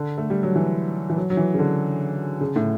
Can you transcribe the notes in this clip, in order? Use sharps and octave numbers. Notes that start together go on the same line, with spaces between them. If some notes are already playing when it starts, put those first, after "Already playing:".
Already playing: D3
A3
G3
F#3
E3
E3
F#3
F#3
E3
C#3
D3
C#3
A2